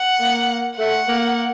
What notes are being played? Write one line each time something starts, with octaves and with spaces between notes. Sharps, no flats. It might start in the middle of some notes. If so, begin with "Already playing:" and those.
Already playing: F#5
A#3
A3 F#5
A#3